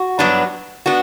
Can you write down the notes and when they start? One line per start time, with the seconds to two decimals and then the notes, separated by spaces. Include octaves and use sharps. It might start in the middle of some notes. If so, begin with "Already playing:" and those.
Already playing: F#4
0.19 G2 F#3 B3 D4
0.86 B3 D4 F#4